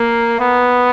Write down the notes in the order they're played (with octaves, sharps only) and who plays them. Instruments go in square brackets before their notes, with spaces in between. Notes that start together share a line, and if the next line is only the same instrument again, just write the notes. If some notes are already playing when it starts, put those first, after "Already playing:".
Already playing: [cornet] A#3
B3